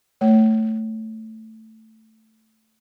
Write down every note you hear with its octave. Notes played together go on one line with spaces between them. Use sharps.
A3 C#5